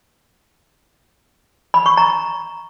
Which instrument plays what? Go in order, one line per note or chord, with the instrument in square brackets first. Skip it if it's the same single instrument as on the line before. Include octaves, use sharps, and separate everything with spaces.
[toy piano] B5
C#6
A#5